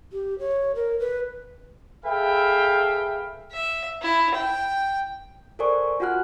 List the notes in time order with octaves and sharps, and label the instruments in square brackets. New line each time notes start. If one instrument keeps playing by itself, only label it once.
[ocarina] G4
C#5
A#4
B4
[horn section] G#4 A4 B4 E5 F5 G5
[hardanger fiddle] E5
E4
G5
[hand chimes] A4 A#4 C5 D5 G#5 C#6
F4 F#4 F#5 G#5 F6 F#6